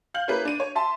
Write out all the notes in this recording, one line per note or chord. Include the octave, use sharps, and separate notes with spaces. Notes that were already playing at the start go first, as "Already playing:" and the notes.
F5 F6 G6 F#7
A#3 C#4 E4 G#4 B4
D4 D#7
C#5
E5 A5 C6